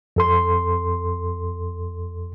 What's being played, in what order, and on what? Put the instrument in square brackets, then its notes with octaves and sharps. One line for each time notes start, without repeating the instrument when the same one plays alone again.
[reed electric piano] F2 A4 C6